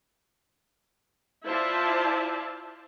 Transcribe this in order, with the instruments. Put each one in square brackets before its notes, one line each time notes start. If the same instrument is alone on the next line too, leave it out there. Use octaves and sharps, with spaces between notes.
[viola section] E4 F4 C5 D5 E5 A5